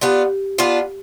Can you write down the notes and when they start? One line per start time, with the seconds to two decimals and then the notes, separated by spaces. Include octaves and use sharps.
0.01 B3 D4 F4 G4
0.58 B3 D4 F4